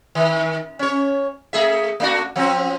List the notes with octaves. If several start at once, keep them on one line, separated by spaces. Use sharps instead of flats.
D#3
C#4 C#5
A3 G#4 E5
A3 D4 F#4
F3 C4 C#4